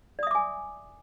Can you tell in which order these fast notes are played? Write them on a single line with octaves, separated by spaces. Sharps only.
D5 D#6 E5 D6 G#5